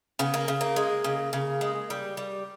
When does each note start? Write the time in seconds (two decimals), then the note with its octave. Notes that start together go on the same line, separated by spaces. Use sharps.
0.19 C#3 B3
0.34 A#3
0.48 C#3
0.61 A#3
0.76 G#3
1.04 C#3
1.33 C#3
1.61 G#3
1.90 G3
2.17 G3